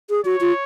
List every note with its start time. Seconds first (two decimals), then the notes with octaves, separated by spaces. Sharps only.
0.10 G#4
0.25 F#4 C#5
0.41 F4